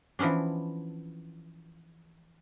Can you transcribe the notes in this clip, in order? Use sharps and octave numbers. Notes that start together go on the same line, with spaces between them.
E3 F3 B3 C#4 D4